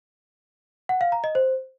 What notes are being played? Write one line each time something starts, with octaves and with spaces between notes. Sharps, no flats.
F#5
F5
A#5
D#5
C5